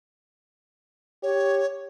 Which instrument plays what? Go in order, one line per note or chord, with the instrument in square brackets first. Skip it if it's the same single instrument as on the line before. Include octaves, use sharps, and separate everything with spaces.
[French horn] G4 [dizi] C#5